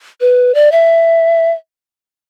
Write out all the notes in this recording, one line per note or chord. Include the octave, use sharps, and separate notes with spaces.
B4
D5
E5